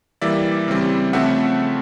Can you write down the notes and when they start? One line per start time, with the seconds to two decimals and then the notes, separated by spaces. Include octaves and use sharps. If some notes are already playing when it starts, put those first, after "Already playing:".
0.22 E3 G3 A#3 D5 E5
0.68 C#3 E3 G3 C4
1.13 C#3 F3 A3 C4 E5 F#5